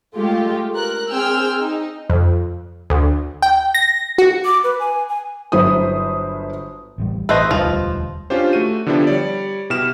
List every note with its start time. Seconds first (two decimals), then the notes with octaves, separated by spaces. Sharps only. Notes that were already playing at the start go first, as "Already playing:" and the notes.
0.16 G#3 A3 F4 G4
0.74 A#4 F#6
1.10 C4 G#4 G5 E6 F6
1.61 D#4
2.10 F2
2.90 D2
3.42 G5
3.75 A#6
4.18 F#4
4.45 D6
4.64 B4
4.80 G#5
5.09 G#5
5.52 G1 F#3 E4 C5 D#6
6.98 A1 A2 G3
7.29 A1 A3 B4 C5 D#5
7.51 E1 D2 F3 G3
8.30 C#4 D4 F4 G4 C5
8.53 A3 F#4 D#7
8.86 D3 F3 B3 D4 E4 G4
9.07 G3 C#5 D5
9.70 B2 E4 G4 F6 E7